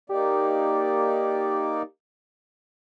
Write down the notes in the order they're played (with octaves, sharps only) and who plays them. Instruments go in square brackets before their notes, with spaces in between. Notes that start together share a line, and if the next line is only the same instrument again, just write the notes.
[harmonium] A#3 D#4 D5 [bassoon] G4